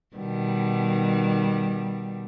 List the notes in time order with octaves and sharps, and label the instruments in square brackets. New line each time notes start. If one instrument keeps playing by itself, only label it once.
[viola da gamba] B2 D#3 G3